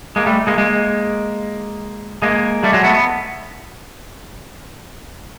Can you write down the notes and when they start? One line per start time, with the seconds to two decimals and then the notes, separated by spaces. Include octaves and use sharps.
0.16 G#3 A#3
0.26 G3 A3
0.47 G#3 A#3
0.58 G#3 A#3
2.22 G#3 A#3
2.63 G3 A3
2.73 F#3 G#3
2.84 A3 B3
2.94 B3